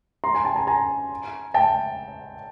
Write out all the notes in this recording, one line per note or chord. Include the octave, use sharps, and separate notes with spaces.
A#5 C6
G#5 A#5
G5 A5
G#5 A#5
G#5 A#5
G5 A5